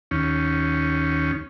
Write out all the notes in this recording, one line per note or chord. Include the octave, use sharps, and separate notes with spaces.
D#2 C#4